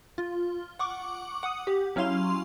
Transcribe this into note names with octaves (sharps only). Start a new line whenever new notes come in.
F4
F#5 C#6 D6
F#5 D#6
G4
F#3 C#4 E4 F5 C6 F7